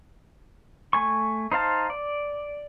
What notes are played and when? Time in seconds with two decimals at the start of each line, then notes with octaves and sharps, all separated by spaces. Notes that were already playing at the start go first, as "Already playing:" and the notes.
0.93 A3 G#5 C#6
1.52 D#4 C5 F5 A5
1.90 D5